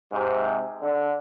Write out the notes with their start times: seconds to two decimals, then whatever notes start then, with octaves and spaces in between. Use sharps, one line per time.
0.12 G#2 C3
0.82 D3